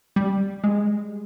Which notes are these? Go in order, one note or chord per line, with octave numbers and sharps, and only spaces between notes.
G3
G#3